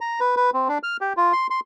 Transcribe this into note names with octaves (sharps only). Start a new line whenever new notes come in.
A#5
B4
B4
C4
D4
F6
G4
F4
C6
C6